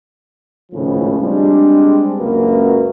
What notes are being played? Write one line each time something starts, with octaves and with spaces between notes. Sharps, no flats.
G#1 C#2 A2 C#3 F3
G3 G#3 C4 D4
C#2 F#2 A#3 F#4 B4